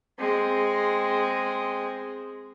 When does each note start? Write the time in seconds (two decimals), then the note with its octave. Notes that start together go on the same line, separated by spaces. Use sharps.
0.19 G#3 C4